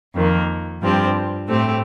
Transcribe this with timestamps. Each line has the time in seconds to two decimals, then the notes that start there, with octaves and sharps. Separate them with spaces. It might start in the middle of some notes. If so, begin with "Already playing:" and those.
0.15 F2 D#3 A#3
0.81 G2 F3 C4 G4
1.48 A2 A3 C4 G4